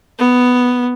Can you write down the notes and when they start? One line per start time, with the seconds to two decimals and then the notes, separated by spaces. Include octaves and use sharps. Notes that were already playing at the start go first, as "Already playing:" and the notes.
0.19 B3